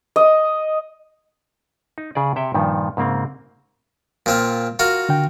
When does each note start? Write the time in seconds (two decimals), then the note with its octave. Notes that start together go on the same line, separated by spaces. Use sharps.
0.16 D#5
1.98 D#4
2.15 C#3 G#4 D5
2.36 C3 C#5 E5 G5
2.54 G2 A#2 D#3 F3
2.97 G#2 C#3 A#3 C4
4.26 A#2 C4 F4
4.79 F4 F#4 A#4
5.09 D3 G5